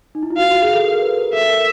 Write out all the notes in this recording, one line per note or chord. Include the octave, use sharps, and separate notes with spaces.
D#4
E4
F4
F#4 F5
F#4
G#4
A4
A#4
B4
A#4
A4 E5
A#4